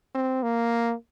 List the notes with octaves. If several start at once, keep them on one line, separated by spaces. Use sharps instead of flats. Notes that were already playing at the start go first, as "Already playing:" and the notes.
C4
A#3